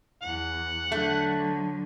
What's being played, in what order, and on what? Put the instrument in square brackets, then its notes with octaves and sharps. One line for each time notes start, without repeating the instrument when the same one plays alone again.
[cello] E2 [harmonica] F#5
[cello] D3 F#3 [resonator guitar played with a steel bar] A3